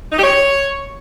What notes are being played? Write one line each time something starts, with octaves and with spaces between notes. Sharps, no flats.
D#4
G4
C#5